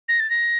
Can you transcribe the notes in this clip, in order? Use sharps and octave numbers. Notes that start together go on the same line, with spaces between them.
A#6
A6
A#6